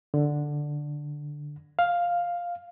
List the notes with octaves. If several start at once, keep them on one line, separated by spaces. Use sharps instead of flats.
D3
F5